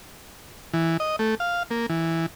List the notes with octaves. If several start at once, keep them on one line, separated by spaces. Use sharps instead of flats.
E3
D#5
A3
F5
A#3
E3